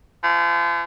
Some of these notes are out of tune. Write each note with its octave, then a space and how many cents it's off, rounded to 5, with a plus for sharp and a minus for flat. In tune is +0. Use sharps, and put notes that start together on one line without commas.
F3 -35